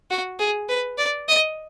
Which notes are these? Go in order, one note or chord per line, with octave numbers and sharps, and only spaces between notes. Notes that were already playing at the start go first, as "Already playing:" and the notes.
F#4
G#4
B4
D5
D#5